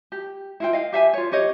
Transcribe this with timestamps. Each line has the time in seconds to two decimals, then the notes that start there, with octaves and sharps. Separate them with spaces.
0.12 G4
0.60 E4 F4 G5
0.73 D#5 F5
0.92 G4 E5 F5 G#5
1.13 F4 C#5
1.32 C#4 G4 C#5 D#5